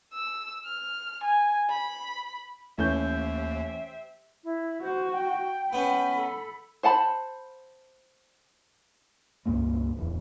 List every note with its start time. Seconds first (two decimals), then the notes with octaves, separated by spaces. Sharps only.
0.13 E6
0.65 F6
1.23 G#5
1.69 B5
2.78 D#2 E3 A3 C#4 G4 C5 E5 G6
4.44 E4
4.82 F#4 C5
5.12 G5
5.73 B3 C#4 B5
6.15 A4
6.83 C5 F#5 A5 B5
9.46 C#2 G2 A#2 A#3
9.96 D1 E2